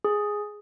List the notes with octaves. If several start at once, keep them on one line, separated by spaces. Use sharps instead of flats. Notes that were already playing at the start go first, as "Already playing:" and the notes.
G#4